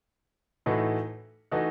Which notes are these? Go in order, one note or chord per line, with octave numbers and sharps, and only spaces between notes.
A2 E3 A3 D#4 F#4
E3 A3 D#4 F#4